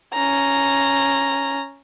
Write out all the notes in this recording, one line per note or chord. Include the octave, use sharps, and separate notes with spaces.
C#4 A#5